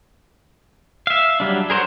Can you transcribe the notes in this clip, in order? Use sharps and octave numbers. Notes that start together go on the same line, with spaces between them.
E5 F5
F#3 G3 D4
G#4 A#4 C5 C#5 F#5